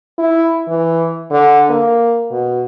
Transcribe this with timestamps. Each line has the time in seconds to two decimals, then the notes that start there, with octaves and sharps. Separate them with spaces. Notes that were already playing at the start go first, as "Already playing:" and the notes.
0.18 E4
0.68 E3
1.31 D3
1.70 A#3
2.32 B2